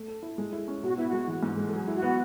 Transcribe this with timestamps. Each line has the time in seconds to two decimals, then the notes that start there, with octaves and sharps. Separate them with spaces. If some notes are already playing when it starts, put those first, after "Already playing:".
Already playing: A3
0.08 A4
0.23 E4
0.38 G#3
0.53 E4
0.68 C#4
0.83 B2 F#4
0.95 B3 E4
1.08 F#4
1.13 G#3
1.28 E3
1.43 G#2
1.57 G#3
1.66 A4
1.73 F#3 G#4
1.88 E4
1.95 F#4
2.03 B3